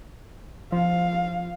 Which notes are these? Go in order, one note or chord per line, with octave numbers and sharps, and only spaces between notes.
F3 F5